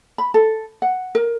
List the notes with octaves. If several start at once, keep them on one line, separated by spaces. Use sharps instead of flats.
B5
A4
F#5
A#4